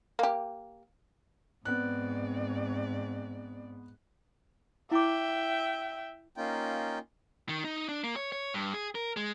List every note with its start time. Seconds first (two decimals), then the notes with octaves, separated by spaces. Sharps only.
0.19 A#3 G4
1.65 G#2 B3 C4 D5 F#6
4.91 E4 E5 G5 D6
6.36 A#3 C#4 D#4 F4 G5
7.49 D#3
7.64 D#4
7.89 D4
8.04 A#3
8.16 C#5
8.32 C#5
8.54 G2
8.74 G#4
8.95 A#4
9.17 G#3